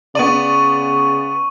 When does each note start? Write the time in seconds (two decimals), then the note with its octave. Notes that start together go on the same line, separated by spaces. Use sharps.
0.15 C#3 B3 D5 C#6 D#7 F#7